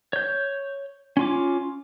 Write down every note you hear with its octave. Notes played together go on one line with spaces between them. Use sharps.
C#5 G6
C#4 F4 D6